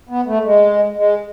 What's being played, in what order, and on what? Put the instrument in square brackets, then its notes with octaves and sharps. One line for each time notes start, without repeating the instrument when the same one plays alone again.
[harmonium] B3
A3
G#3
G#3